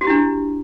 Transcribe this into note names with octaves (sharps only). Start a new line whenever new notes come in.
D4 E4 F#4 G4